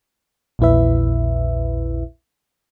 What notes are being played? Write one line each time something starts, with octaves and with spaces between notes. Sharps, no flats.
A#1 E2 A#2 E4 B4 E5